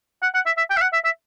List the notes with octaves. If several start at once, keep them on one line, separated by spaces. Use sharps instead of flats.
F#5
F#5
E5
E5
G5
E5
F#5
E5
E5